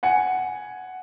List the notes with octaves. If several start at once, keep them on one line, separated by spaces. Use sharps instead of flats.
F#5 G#5 C#7